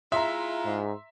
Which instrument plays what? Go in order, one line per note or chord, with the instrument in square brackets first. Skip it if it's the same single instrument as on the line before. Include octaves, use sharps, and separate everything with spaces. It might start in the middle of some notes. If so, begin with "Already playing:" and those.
[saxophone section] G#3 E4 F4 [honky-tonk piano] E5 [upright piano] A#5 C6
[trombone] G#2